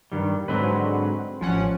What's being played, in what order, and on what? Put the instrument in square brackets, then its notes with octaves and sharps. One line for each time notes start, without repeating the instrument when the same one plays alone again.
[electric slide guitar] G2 D#3 G3
[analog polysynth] G#2 D3 F#3 [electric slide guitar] C4 B4
[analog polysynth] A1 C#4 F#5 [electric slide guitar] F3